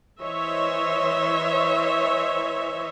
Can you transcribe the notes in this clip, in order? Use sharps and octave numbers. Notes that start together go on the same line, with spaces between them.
E3 C5 C#5 D#5 E5